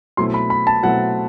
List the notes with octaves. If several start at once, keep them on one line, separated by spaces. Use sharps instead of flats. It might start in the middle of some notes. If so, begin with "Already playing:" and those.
B2 F#3 A3 C4 E4 C6
B5
B5
A5
B2 F#3 A3 C4 E4 F#5